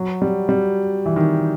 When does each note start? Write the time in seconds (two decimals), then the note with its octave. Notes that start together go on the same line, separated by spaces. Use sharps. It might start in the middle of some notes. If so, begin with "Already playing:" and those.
Already playing: F#3
0.22 G3
0.49 G3
1.06 E3
1.16 D#3